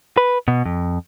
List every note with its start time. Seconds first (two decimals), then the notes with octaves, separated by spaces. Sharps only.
0.17 B4
0.48 B2
0.66 F2